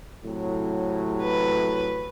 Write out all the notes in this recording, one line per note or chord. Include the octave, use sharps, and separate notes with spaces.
A2 C3 F#3
B4